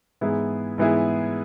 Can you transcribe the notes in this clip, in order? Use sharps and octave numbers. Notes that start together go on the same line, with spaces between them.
G#2 E3 B3 E4 G#4
G#2 E3 B3 E4 G#4